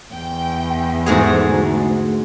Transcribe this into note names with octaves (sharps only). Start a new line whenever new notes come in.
E2 G5
G#2 E3 A3 F#4 G#4
D2